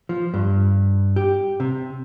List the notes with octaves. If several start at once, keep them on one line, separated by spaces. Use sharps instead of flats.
F3
G2
G4
C3